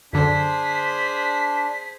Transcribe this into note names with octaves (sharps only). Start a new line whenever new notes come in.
F#2 D3 D4 G#4 C5 B6